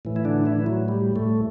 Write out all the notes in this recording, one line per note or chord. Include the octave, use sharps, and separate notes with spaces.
A2 E3
E4
D3 D4
E3 E4
F#3
G3
A2 A3